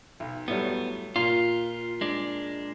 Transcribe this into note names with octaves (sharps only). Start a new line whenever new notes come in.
B1
A2 F#3 G3 B3
A#2 F4
G#3 D4